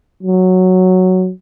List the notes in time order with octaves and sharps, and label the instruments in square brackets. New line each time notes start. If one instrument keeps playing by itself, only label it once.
[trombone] F#3